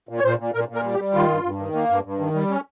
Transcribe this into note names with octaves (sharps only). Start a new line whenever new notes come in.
A#2
C#5
A#2 C5
A#2
A#2 A#4
A#2
A#4
G3
G4
G3
D#3 F4
G2
G2
D#3
A#3
G2
G2
D#3
G3
C#4